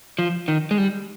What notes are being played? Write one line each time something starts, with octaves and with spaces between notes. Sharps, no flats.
F3
D#3
G#3
G3